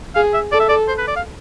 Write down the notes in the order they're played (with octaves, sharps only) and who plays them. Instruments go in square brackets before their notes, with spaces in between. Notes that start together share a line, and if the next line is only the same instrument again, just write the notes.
[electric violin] G#4 [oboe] F5
[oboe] E5
[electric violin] A4 [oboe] D5
[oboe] E5
D5
C5
B4
D5
F5